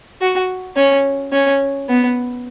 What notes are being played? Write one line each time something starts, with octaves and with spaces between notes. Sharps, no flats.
F#4
C#4
C#4
B3